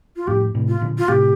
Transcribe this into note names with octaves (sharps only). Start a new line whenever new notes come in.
F4
F2 A2 G4
A2 C3
F4
A#2 D3
F4
A2 C3 G4